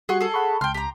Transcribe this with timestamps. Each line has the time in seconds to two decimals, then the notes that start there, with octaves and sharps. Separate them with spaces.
0.09 G3 F#4 G#4 C6 F#6 C#7
0.21 G#4 A4
0.34 F#5 B5 C#6
0.61 C#2 G5 C6 F6
0.74 G4 A#5